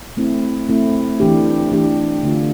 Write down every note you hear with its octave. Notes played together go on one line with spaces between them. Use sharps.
A3 C4 E4
A3 C4 E4
E3 A3 D4 G4
E3 A3 D4 G4
D3 A3 D4 F4